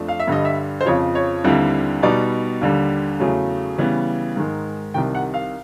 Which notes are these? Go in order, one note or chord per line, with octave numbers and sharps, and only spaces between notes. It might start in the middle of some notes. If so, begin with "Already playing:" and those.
Already playing: F2 F3 A3 D4
F5
E5
G2 D3 G3 D#5
E5
C5
F2 C#3 F3 C#5
C#5
D#2 D3 G3 C4 E4
B2 G3 B3 D#4 D5
D#2 D3 G3
E2 C#3 F#3 A3
C#3 E3 G3 B3
G#2 D#3 G#3
C2 C3 D#3 G5
F#5
F5